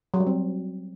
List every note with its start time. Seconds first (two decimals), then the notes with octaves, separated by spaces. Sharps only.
0.14 F#3
0.20 G3
0.27 C4